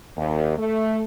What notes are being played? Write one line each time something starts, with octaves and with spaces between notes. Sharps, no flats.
D#2
A3